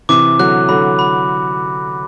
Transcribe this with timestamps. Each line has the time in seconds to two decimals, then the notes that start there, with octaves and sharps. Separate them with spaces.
0.09 C3 E3 D6
0.39 D3 F#3 F#6
0.69 D3 F#3 B5
0.99 B5